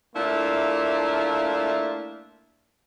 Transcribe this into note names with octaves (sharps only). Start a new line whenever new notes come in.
A3 A#3 D4 E4 F4